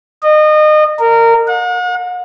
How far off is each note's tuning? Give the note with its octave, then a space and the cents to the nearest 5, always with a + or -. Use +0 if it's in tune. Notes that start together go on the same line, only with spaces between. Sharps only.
D#5 -30
A#4 -20
F#5 -45